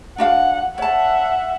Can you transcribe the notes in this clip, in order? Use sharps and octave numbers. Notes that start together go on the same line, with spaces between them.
D4 F#4 F5 F#5
C#5 E5 F#5 A5